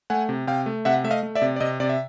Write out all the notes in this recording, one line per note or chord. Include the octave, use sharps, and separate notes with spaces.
A3 F#5 G#5
C3
C3 F5 G5
A3
C3 E5 F#5
A3 E5
D#5 F5
A3
D5 E5
C3
D5
C3 D#5
C3 D5
E5